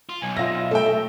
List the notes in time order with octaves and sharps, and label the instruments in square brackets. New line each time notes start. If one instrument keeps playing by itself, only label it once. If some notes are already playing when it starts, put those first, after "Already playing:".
[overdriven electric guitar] F4
[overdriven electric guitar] B1 [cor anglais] G#5
[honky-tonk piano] F4 A#6 [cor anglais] E5
[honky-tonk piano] A3 G5
A3